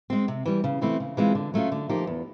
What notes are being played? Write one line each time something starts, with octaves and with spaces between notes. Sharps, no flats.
G#3 C4
C3
E3 G3
C#3
E3 A3 C4 E4
C#3
E3 G#3 C4 F4
D3
F#3 A3 C#4 F4
D3
F3 A#3 D#4 G4
E2